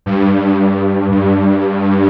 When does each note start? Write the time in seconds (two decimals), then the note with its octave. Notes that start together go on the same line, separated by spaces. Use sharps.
0.06 G2
1.11 G2